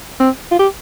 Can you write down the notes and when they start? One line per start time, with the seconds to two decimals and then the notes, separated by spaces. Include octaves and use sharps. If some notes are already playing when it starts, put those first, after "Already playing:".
0.20 C4
0.52 F4
0.59 G4